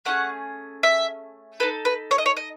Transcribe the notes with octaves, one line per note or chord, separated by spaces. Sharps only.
A3 C#4 G#4 F#5
E5
D#4 A4 B4
B4
C#5
D#5
C#5
D#5